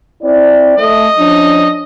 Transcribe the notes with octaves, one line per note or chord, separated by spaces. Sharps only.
C4 E4 D5
A3 D#5
F3 C#4 D4